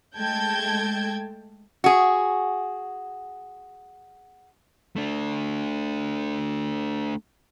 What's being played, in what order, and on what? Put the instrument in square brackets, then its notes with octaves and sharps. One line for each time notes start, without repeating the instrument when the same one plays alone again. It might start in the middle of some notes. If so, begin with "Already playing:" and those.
[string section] G#3 A3 G5 A5 G6 G#6
[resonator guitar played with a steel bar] F#4 G#4
[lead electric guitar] A3 D4